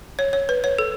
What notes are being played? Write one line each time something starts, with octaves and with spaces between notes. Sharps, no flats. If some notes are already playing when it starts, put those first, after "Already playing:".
C#5
C#5
B4
C#5
A4